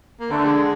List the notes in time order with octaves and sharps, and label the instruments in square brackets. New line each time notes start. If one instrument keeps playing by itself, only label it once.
[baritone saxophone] A#3
[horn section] D3 [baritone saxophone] A3
[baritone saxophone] G#3